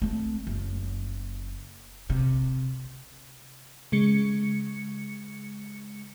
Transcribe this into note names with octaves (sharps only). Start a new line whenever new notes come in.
A3 C4
F#1
C3
C#3 G#3 C#7